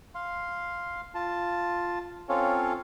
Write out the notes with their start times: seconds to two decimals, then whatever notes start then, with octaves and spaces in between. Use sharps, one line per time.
0.15 F5 C6
1.15 F4 A5
2.29 C4 C#4 F4 A4 C#5 F5